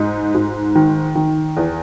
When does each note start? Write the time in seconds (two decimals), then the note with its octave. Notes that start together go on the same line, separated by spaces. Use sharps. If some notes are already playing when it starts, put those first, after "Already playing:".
Already playing: G#2 D#4
0.35 G#2
0.75 D#3
1.15 D#3
1.57 E2